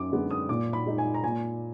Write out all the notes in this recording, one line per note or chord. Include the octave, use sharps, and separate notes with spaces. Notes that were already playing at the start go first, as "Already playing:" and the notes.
Already playing: F#2 D6
D3 G#3 B3
D#6
A#2 D6
B5
G#3 D#4
G#5
A#5
A#2 G#5